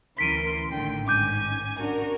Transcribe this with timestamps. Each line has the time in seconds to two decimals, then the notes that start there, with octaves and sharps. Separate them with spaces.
0.18 D2 E3 C#4 A#4 C6 B6 D7 D#7
0.72 A1 D3 D#3 A3 G5
1.08 G#2 D#3 C#4 G#5 D6 G6
1.79 C#4 D4 F#4 A#4